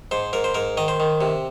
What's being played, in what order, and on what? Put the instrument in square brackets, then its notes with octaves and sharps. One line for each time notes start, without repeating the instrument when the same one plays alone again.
[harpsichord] G#2 C5
G#2 A#4
C5
G#2 A#4
D#3 D#5
C5
D#3
C3